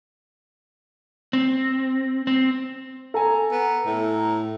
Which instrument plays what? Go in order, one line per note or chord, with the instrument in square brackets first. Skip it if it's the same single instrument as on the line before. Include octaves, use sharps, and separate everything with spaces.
[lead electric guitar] C4
C4
[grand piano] A4 G#5 [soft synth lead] A#5
[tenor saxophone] B3
A2